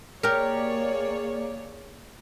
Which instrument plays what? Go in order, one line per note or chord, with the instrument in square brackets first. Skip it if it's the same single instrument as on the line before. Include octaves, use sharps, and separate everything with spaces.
[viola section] A#3 G#4 D5 [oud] G4 A#4 [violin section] C#5